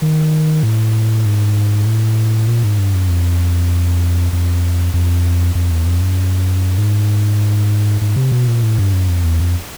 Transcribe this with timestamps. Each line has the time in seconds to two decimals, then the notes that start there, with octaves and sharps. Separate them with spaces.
0.02 D#3
0.63 A2
1.25 G#2
1.86 A2
2.48 A#2
2.63 G#2
2.79 G2
2.94 F#2
3.09 F2
4.33 F2
4.94 F2
5.55 F2
5.71 E2
5.86 F2
6.01 F#2
6.78 G#2
8.01 G#2
8.16 C3
8.32 B2
8.48 A#2
8.63 A2
8.78 G2
8.93 F#2
9.08 F2
9.24 E2
9.40 F2